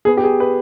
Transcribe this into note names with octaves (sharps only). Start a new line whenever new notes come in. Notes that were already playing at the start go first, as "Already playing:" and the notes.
B3 G#4
G4
G#4
B4